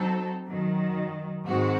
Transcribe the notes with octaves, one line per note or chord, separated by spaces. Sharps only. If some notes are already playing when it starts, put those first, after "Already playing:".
Already playing: F#3 C4 D#4 A4
F#2 D#3 F#3
G#2 D#3 G#3 C4 F#4